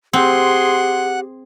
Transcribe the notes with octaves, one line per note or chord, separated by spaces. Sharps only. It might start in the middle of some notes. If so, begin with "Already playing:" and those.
C4 G4 G#4 F#5 C6